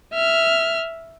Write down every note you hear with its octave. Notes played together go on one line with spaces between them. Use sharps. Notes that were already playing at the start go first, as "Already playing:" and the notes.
E5 F6